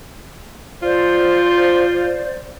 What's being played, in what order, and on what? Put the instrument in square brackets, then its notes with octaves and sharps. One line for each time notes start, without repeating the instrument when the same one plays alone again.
[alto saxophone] F4 [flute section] C5 D5